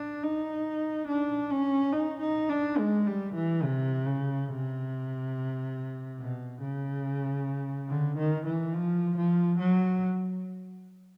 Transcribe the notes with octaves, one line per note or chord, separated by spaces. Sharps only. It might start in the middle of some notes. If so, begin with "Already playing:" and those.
Already playing: D4
D#4
D4
C#4
D#4
D#4
D4
G#3
G3
E3
C3
C#3
C3
B2
C#3
D3
D#3
E3
F3
F3
F#3